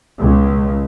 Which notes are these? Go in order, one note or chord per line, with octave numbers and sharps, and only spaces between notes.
C#2